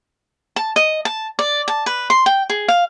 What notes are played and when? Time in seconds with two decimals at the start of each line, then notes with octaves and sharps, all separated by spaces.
0.56 A5
0.76 D#5
1.05 A5
1.39 D5
1.68 A5
1.86 B4
2.10 C6
2.26 G5
2.50 G#4
2.68 F5